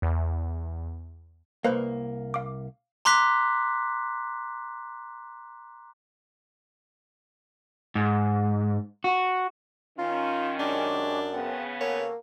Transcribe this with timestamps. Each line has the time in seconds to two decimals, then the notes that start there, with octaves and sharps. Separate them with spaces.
0.02 E2
1.64 C2 A#3 B4 C5 F5
2.34 F5 D6
3.05 A#5 C6 D6 F#6 B6
7.95 G#2
9.04 F#4
9.99 D#3 C#4 F4 A#5 C6
10.60 F#2 G#3 D4 G4 C#5
11.33 C#3 B3 C4 F#5 A5
11.81 A#3 F#4 A4 C#5